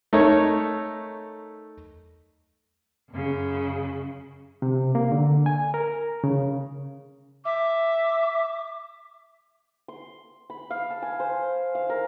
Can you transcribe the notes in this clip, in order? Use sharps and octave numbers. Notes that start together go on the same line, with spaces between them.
A3 D#4 A#4 C#5
F#2 C#3
C3
A#3
D3
G#5
A#4
C#3
E5 D6
C6
B5
F5
A5
G#5
C5
F5
A#4